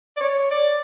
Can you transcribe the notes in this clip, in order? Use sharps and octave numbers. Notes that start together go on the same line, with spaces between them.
D5
C#5
D5